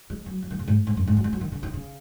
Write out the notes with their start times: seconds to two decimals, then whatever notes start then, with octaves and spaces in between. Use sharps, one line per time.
0.10 G#3
0.26 F#3
0.42 F#3
0.51 D#3
0.59 C#3
0.68 G#2
0.87 G#2
0.97 F#2
1.07 G#2
1.17 F#3
1.24 G#3
1.33 F#3
1.41 D#3
1.52 C#3
1.63 D#3
1.74 C#3